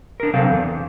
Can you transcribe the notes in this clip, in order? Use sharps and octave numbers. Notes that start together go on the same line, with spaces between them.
D4 A#4
C3 F#3 C4 A4 F5
E2